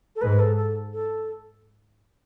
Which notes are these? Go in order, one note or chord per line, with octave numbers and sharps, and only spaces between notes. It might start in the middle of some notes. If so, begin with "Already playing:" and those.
A4
G#2 B4
A4
A4
A4